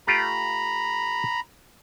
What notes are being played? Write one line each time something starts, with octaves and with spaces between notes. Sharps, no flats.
A3 F4 G4 A#5 B5